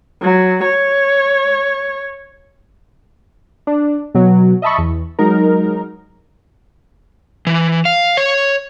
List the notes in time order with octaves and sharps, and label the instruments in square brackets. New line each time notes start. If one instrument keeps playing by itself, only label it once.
[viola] F#3
C#5
[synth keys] D4
B2 F#3
D#5 E5 A5 B5 C#6
E2
F#3 G#3 D#4 A#4
[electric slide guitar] E3
F5
C#5